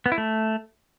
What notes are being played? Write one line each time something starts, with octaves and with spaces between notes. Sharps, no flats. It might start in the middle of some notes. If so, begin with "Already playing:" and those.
B3
E4
A3